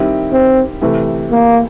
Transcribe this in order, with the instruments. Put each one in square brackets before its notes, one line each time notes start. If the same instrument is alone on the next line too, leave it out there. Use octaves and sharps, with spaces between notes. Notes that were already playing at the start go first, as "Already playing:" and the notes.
Already playing: [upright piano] D#3 G3 C4 E4 G4
[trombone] C4
[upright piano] C3 E3 A3
[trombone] A#3